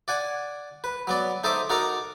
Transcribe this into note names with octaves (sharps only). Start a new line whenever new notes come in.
D5 F#5 G#5
B4
F#3 B3 D5
D#4 A4 C5 D#5 E5 D6
D#4 F#4 A4 A#4 A#5 D6